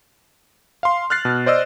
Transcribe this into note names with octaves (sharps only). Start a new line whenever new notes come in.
F5 C6
F6 F#6 A6 C7
B2
C5 D5 D#5 E6